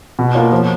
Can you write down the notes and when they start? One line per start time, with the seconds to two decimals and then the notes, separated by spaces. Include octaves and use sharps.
0.19 B2
0.35 A#3 F4 A#4 C#5
0.52 F3